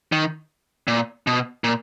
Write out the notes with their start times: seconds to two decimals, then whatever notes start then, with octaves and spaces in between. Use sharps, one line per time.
0.12 D#3
0.88 A#2
1.27 B2
1.64 A#2